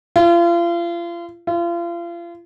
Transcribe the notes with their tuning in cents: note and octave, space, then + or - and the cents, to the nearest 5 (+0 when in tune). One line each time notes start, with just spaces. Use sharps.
F4 -35
F4 -35